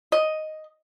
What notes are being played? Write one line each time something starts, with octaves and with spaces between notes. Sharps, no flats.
D#5